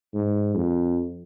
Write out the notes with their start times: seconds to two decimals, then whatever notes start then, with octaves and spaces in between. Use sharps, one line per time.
0.14 G#2
0.55 F2